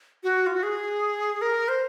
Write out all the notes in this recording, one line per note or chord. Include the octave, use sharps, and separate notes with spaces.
F#4
F4
F#4
G#4
A#4
C5